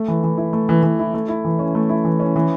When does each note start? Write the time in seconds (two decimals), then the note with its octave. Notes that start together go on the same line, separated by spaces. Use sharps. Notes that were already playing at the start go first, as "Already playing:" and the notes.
Already playing: A3
0.08 E3
0.24 E3
0.38 E4
0.53 A3
0.69 E3
0.83 E3
0.99 E4
1.14 A3
1.28 E4
1.45 E3
1.59 C#4
1.75 A3
1.89 E4
2.05 E3
2.20 C#4
2.36 E3